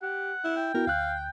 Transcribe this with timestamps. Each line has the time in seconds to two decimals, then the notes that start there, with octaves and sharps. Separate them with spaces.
0.02 G4 F#5
0.44 E4
0.56 G5
0.74 B3 E4 F#4 A#4
0.87 D2 F5 F#6